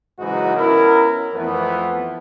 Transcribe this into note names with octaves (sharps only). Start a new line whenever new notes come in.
G#2 C#3 E3 F#3 D#4 F#4
B3 C#4 E4 A#4
F2 E3 F3 A3 B3